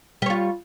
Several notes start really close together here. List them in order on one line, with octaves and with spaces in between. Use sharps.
G3 C#5 F4